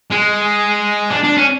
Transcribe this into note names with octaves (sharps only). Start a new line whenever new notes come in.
G#3
D4
D4
C#4